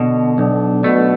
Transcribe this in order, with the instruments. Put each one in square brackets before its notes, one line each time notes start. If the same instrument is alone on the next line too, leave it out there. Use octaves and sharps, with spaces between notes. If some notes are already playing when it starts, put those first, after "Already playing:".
Already playing: [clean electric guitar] B2 [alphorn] D3
[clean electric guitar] B1 [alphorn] D4
[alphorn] B2 [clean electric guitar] A3